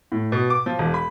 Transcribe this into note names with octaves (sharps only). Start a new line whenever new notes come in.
A2
B2
D6
F3
E1
B5